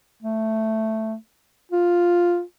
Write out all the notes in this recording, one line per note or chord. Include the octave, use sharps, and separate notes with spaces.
A3
F4